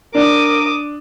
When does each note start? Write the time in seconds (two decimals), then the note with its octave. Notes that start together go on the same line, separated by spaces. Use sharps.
0.15 D4 A#4 D6 D#6